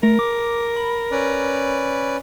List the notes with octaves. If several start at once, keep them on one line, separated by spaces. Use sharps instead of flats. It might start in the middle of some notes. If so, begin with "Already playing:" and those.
A3 A#4
D6
B5
C#4 B4 D5